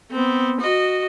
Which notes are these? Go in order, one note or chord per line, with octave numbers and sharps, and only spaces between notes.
B3 C4
F#4 D#5